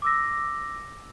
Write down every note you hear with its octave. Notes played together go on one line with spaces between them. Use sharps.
D6 E6 A#6